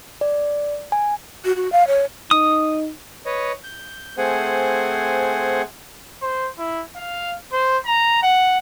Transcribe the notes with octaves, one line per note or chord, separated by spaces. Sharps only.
D5
G#5
F#4
F#4
F5
C#5
D#4 D#6
B4 C#5 D#5
G6
A3 C4 G#4 C5 F#5 G#5
C5
E4
F5
C5
A#5
F#5